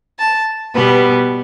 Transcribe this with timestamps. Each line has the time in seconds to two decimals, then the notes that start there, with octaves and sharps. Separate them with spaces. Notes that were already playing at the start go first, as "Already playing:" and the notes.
0.19 A5
0.74 B2 G3 B3 B4